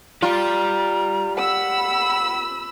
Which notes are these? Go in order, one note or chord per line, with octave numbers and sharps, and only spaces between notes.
F4 G4 D5 A#5
F#5 B5 E6